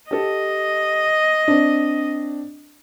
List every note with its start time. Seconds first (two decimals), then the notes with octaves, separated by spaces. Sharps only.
0.11 G4 A4 D#5
1.48 C4 D4